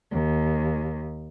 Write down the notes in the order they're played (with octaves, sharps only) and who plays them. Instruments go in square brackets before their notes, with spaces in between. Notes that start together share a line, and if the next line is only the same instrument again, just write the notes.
[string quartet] D#2